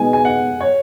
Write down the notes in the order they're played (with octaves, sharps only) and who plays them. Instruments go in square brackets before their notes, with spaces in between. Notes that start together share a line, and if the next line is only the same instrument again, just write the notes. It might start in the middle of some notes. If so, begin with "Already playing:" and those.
Already playing: [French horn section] B2 G#3 B3 D#4 G#4 [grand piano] G#5
[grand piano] G#5
F#5
C#5